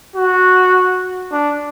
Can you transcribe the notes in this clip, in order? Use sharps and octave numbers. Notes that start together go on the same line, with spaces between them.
F#4
D4